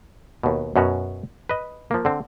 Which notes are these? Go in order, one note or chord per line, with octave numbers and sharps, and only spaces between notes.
D#2 B2
F#2 B2 C#4 F#4
B4 D#5
F3 A#3
D3 C4